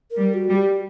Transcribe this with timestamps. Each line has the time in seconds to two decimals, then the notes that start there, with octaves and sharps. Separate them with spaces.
0.11 A#4
0.19 G3
0.34 F#4
0.49 G3
0.56 G4